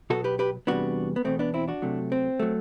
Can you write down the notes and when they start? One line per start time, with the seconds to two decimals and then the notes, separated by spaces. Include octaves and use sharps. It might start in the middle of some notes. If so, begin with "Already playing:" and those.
0.10 B2 F#3 B3 F#4 A4
0.24 G4 B4
0.39 G4 B4
0.67 E2 C3 G3 B3 D4 F#4
1.16 B3
1.25 E2 B2 A3 C4
1.39 B3 D4
1.54 C4 E4
1.68 D4 F#4
1.82 C3 F#3 A3
2.12 C4
2.40 F#3 A3